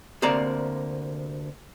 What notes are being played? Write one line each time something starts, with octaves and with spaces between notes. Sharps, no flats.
D2 C3 A#3 C5 D5 A#5